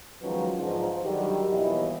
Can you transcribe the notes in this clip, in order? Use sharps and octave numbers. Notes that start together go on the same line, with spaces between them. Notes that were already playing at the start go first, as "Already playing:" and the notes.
D#3 F3 F#3 G#3 C#4 B4
G#2 D3 F3
D3 D#3 F#3 G3 G4
D#2 B2 E3 E4 D#5